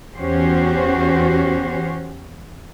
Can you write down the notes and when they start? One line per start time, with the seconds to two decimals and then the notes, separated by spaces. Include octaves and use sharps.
0.16 E2 C#4 F#4 G4 C5